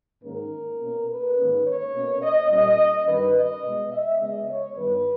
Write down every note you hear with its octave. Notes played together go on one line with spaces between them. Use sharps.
G#2 D#3 A#3 C#4 A#4
B2 A#3 C#4
B4
G#2 D#3 A#3 C#4
C#5
B2 A#3 C#4
D#5
A#2 G3 C#4 D#5
G2 D#3 G3 C#4 B4
D#5
B2 G#3 B3
E5
C#3 G#3 B3 D#5
C#5
G2 D#3 G3 B3 B4